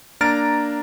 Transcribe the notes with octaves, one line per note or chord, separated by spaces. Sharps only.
A#3 D4 A#5 F6 A6 D7